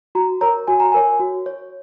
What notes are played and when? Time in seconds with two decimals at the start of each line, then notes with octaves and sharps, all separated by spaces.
0.15 F#4 A#5
0.41 A#4 C#5 A#5
0.67 F#4 G#5
0.80 A#5
0.92 A#4 C#5 G#5
1.20 F#4
1.46 C#5